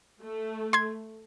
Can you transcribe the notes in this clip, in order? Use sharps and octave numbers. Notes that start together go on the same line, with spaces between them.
A3
C6 G#6